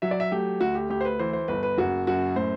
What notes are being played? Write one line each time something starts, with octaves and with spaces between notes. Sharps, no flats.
F#3 E5
D5
E5
A3 G4
D2 F#4
G4
D2 G4
C5
B4
E3 C5
C5
G1 B4
B4
F#1 F#4
F#2 F#4
A2 C5